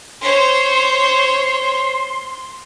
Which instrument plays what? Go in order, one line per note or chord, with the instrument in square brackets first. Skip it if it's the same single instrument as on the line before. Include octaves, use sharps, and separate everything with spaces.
[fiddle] C5 C#5 [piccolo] C6